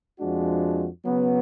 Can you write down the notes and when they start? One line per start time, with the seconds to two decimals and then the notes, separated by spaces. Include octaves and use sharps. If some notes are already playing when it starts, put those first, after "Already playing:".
0.19 F2 F3 G#3 D4 F#4
1.05 C#3 F#3 B3